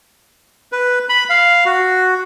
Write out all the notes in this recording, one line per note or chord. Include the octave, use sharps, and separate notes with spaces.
B4
B5
F5
F#4